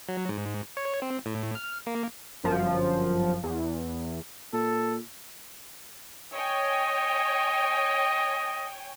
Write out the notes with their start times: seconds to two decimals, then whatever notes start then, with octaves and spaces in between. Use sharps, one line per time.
0.09 F#3
0.29 G#2
0.77 C#5
1.02 C4
1.26 A2
1.55 F6
1.87 A#3
2.43 G1 F#2 F3
3.43 E2
4.53 A#2 A4
6.34 C#5 D#5 G5 G#5